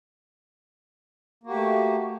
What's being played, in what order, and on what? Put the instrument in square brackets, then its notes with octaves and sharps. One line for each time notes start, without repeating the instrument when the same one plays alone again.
[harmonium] A#3
F#4
G4
A3